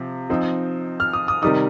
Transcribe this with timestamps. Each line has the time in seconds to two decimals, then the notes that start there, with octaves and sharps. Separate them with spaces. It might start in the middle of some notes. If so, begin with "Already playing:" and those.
Already playing: C3 F3
0.30 F3 C4 D#4
1.00 F6
1.13 D#6
1.28 D#6
1.42 C3 D#3 G3 D#4 D#6